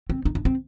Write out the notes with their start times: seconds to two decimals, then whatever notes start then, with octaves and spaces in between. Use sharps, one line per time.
0.10 C4
0.25 D#4
0.35 D4
0.45 C4